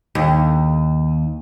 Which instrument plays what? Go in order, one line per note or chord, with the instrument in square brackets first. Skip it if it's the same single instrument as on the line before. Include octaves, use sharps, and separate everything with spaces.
[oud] D#2